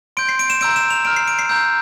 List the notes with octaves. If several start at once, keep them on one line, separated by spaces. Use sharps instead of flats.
C6 G6 D7
C7
D7
E7
A#5 E6 G6 D7
E7
F7
A#5 F6 D7
C7
D7
C7
A#5 E6 G6